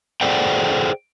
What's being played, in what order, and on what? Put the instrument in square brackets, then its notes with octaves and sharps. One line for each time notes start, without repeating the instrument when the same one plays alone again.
[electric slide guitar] G#4 A4 C5 D5 F#5 G5